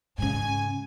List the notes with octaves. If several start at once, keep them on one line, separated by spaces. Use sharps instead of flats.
G#2 C#3 G#5